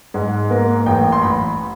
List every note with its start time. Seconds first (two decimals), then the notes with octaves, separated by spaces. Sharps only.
0.14 G#2
0.50 A#3
0.86 A1 G5
1.12 C6
1.23 A1 B5